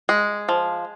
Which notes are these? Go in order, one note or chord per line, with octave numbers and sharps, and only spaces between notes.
G#3
F3